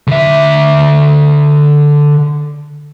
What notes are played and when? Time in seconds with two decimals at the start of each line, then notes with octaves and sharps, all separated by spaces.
0.08 D3 E5